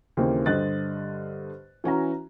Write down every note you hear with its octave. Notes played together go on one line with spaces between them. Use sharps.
D#2 C#3 E3 A#3 C4
G2 D3 C5 D#5 F#6 A6
E3 C#4 F#4 A#5